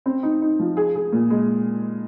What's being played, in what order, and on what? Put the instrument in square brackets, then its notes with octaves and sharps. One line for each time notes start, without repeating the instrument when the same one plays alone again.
[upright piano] C4
D#4
D#4
F3
G#4
G#4
A#2
G#3